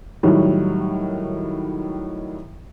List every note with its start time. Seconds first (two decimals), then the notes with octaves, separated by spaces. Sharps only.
0.23 A2 D#3 F#3 G3